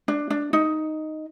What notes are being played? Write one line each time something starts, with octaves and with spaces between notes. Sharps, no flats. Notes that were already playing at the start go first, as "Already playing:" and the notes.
D4
D4
D#4